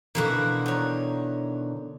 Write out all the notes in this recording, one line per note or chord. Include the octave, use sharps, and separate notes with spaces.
B2 D3 E3 A#3 E4 F#4
D#3 C#5